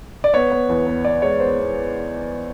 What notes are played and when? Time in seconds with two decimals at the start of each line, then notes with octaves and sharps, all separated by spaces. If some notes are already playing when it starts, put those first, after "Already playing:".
0.24 D5
0.34 B3 C#5
0.51 B3
0.69 E2
0.87 B3
1.04 B3 D5
1.22 G#3 C#5
1.40 B3 C5
1.58 B3